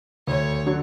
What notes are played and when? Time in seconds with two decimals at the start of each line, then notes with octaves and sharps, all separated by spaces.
0.28 D2 C#5
0.66 D3 F#3